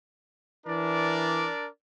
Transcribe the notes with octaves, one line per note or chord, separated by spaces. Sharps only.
E3 D4 A#4 D5